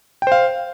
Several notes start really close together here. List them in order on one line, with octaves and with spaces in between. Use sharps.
G5 C5 F5